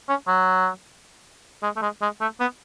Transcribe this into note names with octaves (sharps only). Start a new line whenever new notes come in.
C#4
F#3
G#3
A3
G#3
G#3
A3
B3